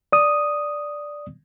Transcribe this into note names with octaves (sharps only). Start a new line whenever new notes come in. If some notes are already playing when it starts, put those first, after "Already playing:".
D5 D#6